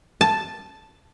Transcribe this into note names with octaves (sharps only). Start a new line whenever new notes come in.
A5